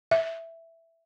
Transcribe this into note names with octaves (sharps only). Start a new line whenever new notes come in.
E5